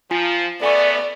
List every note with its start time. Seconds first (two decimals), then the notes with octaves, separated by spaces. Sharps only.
0.11 F3 F4 G#5
0.62 C#3 A3 B3 A4 D5 G#5 C#6